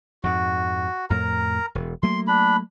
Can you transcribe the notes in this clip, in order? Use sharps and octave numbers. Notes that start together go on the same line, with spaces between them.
F2 G#2 F#4
F2 A2 A#4 A#5
E1
F#3 A3 A#3 C6
D4 B5